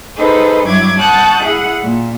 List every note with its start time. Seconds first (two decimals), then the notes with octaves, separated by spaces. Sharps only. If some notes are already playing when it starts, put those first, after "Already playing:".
0.16 D#4 G#4 A4 B4 C5
0.65 G2 F#3 E4 D6 G#6
0.98 F#5 A5 C#6 D#6 F#6 G6
1.42 E4 G#4 F#5
1.81 A#2